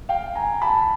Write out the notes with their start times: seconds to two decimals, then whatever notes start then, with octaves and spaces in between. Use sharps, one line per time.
0.09 F5 G5
0.35 G#5 A#5
0.62 A5 B5